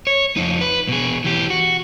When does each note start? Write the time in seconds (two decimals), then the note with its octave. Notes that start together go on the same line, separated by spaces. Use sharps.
0.07 C#5
0.36 F2 D#4
0.61 B4
0.89 B2 G#4
1.24 E3 G4
1.50 F#4